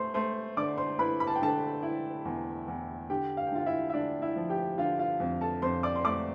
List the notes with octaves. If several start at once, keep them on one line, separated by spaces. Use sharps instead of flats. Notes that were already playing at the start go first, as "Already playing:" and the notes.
Already playing: A3 C5 C6
A3 C5 C6
D3 D5 D6
C5 C6
E4 B4 B5
B5
A5
G5
D3 A4 A5
E4
E2
E2
D3 G4 G5
F5
G5
D3 F4 F5
E4 E5
E5
D3 D4 D5
E4 E5
F3
G4 G5
D3 F4 F5
F4 F5
F2
A4 A5
F2 C5 C6
D5 D6
C6
A3 D5 D6